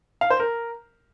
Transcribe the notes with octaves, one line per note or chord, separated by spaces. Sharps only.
F5
C5
A#4